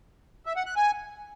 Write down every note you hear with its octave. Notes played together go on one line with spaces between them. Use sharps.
E5
F#5
F#6
G#5